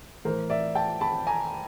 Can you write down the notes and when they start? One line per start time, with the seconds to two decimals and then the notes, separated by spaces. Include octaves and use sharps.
0.25 A2 E3 A#4 C5
0.50 D5 E5
0.75 G5 A5
1.01 A5 B5
1.27 G#5 A#5